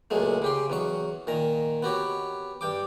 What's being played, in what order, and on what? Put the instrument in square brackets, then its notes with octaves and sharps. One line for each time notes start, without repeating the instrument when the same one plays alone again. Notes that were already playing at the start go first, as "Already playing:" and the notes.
[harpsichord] C#2 A#2 F#3 G#3 A3
C#3 G4 C6
E2 F#3 C#6
A#2 D#3 A#5
B3 F#4 G4 C#5
G2 G5 D6